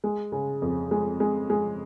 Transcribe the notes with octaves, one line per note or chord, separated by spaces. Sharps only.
G#3
C#3
F2
G#3
G#3
G#3